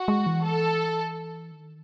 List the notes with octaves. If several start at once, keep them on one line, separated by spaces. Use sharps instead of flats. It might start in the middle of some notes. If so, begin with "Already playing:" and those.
Already playing: F#4
G#3
E3
A4
D#3